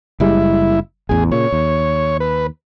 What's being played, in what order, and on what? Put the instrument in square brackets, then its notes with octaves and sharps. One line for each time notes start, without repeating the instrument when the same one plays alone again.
[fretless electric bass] F#1 G3 G#3 [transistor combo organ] E4
[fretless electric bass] A1 E2 [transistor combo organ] G#4
[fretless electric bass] A#2 C#3 [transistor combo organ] C#5
[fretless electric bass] D#2
[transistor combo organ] B4